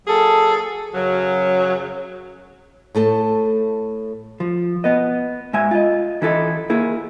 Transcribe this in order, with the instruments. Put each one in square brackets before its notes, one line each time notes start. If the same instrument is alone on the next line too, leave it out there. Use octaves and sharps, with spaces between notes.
[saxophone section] F#3 A#3 G#4 A4
F#2 C#3 F#3
[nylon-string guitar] A2 A3 A4 A5
[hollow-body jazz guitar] F3
B3 B4 D#5
G#2 G#3 E5 G#5
F4 D#5
E3 E4 A4 D#5
A#3 E4 G#4